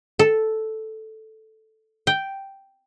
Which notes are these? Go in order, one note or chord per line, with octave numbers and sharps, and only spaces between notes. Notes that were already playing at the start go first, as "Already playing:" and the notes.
A4
G5